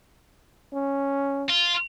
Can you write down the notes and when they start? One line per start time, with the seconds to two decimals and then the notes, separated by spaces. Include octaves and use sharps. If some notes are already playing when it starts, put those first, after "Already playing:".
0.73 C#4
1.50 F4